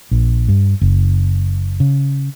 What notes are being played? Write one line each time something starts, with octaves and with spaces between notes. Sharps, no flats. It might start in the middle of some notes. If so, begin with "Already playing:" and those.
A#1
G2
F#1
C#3